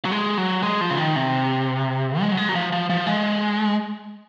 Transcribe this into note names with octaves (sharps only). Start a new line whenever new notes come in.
F#3
G#3
F#3
G#3
F3
C#3
D#3
C3
G#3
F#3
G#3
F#3
F3
F3
F3
G#3